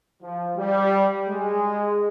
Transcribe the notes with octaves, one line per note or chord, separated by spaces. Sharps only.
F3
G3
G#3